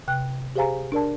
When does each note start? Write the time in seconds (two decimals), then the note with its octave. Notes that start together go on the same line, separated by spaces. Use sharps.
0.08 C3 G5 F#6
0.56 G4 G#4 C5 F5 G#5 A#5
0.92 D4 A#4 D5 A5